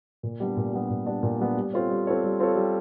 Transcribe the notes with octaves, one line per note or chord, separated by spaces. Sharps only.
A#2
G3 B3 D4
A#2
G3 B3 D4
A#2
G3 B3 D4
A#2
G3 B3 D4
G3
C4 F4 A4 C#5
G3
C4 F4 A4 C#5
G3
C4 F4 A4 C#5
G3